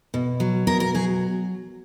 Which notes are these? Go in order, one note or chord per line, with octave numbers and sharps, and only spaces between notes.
B2
F#3
B2 A#4
A#4
F#3 G#4